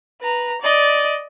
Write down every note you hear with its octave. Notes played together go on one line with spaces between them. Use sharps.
B4 A#5
D5 D#5